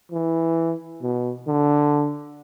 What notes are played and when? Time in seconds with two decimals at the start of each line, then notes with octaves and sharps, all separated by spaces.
0.12 E3
1.02 B2
1.47 D3